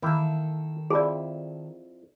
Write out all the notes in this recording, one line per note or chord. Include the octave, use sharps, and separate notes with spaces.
D#3 A#3 E4 A4 G5
F2 E4 G#4 D5